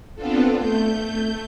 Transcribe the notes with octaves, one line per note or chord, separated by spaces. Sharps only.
B3 C4 D4 F4 A4
A3 G6